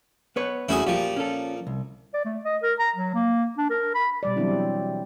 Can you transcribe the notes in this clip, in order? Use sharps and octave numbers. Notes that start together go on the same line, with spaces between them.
B3 B4 C#5
E2 A3 C#4 E4 F#4 G#4
A#2 F3 G4
C#4 A4
C2
D5
A3
D#5
A#4
A#5
F#3
A#3
D4
A#4
B5
B2 G3 D5
E3 F#3 G3 C4 D4 E4